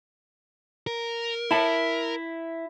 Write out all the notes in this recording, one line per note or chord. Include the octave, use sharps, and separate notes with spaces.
A#4
E4 A5